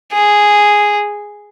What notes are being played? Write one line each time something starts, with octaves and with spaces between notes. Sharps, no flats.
G#4